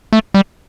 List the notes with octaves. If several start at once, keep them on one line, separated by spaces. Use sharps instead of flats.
A3
G3